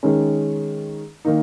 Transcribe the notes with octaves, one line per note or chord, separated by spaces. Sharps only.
D#3 G#3 C#4
D#3 A#3 D#4